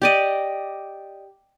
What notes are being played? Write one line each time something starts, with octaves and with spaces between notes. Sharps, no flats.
G4 D5 D#5